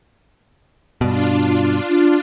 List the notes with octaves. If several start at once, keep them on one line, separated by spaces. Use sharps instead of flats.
G2 B2 D4 F4